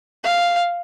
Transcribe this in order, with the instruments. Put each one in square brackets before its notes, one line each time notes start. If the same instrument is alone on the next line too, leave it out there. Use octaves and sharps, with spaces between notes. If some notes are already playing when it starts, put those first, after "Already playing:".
[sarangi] F5